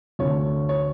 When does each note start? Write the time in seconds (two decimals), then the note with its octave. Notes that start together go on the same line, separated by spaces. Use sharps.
0.19 D2 D3 A3 C#5
0.69 C#5